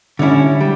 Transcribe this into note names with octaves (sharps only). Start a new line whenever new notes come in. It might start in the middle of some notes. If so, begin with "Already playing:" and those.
D3 G3 C#4 E4
G3